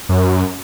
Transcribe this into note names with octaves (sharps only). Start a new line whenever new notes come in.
F#2